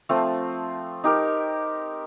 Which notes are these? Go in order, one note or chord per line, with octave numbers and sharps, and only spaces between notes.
F3 A3 C4
D#4 G4 A#4